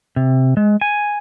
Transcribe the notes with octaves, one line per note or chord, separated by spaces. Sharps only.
C3
G#3
G#5